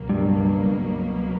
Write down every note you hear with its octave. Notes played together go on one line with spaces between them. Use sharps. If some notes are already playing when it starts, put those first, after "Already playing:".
Already playing: C#2 B2 F#3 A#3
G2